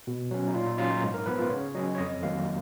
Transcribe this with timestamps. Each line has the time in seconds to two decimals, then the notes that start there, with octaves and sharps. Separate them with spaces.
0.07 B2
0.31 F#3 C#4
0.48 D#4
0.54 A#2 F4
0.66 D#4
0.78 F#3 C#4 F4
0.91 D#4
1.03 G#2
1.14 A#4
1.26 F3 B3 B4
1.38 F4
1.50 C#3 C#5
1.74 F#3 C#4 D#5
1.95 C#5
1.98 F2 D#5
2.22 D#3 F#3 A#3 F5